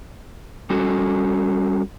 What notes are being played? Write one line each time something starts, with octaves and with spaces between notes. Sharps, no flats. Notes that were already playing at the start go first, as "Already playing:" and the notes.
G3 C#4 F#4 A4